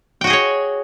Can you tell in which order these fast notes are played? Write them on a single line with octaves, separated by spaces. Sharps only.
G5 F#4 D#5 G#4 C#5